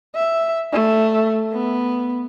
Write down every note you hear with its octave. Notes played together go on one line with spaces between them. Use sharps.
E5
A3
B3